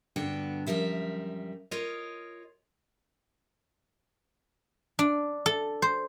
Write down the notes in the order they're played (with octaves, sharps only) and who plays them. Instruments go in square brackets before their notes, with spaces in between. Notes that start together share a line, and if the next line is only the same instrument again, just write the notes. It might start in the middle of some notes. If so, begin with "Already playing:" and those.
[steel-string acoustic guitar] G2 D3 B3 D4 F#4 G5
F#2 F3 G3 A#4 E5
F4 A#4 C#5 D#5
[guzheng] D4
A4
C5